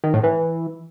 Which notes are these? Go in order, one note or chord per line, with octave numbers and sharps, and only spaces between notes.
D#3
A2
E3